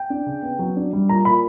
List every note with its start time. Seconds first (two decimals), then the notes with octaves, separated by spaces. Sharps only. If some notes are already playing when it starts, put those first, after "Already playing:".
Already playing: G5
0.10 D4
0.26 C#3
0.43 B3
0.59 F#3
0.76 D4
0.93 G3
1.09 A#2 A#5
1.25 A#2 B5